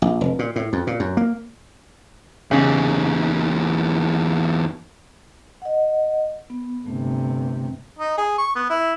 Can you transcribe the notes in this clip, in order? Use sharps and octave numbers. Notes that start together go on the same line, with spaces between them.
A#1
F1
A#2
A2
F2
A#2
F#2
A#3
E2 C#3 D#4
D#5 F#5
B3
G1 C3 A3
D#4
G#4
C#6
B3
E4